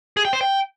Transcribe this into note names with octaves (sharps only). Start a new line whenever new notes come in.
G#4
G5
C5
G5